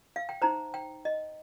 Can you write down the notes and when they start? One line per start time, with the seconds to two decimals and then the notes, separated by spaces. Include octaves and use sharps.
0.16 F5
0.29 G5
0.42 D#4 C5 A#5
0.74 G5
1.05 D#5